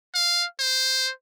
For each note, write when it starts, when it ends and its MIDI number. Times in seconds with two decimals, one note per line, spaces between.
0.15 0.45 77
0.59 1.11 72